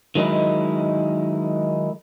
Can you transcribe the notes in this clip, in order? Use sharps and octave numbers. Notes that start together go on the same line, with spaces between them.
D#3 F#3 G#3 D#4 E4